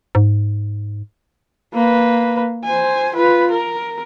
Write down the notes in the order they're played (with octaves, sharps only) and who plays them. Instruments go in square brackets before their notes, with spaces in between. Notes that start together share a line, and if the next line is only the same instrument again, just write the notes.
[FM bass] G#2
[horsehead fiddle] A#3 B4
C5 G#5
F4 B4
A#4